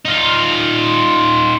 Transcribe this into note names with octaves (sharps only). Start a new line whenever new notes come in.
D#4 F4